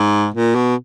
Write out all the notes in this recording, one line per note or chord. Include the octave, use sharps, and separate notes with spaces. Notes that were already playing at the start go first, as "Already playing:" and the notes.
Already playing: G#2
A#2
B2